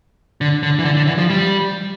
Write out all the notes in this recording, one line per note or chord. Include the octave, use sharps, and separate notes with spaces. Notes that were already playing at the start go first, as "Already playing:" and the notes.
D3
D3
E3
D3
D3
E3
F3
G3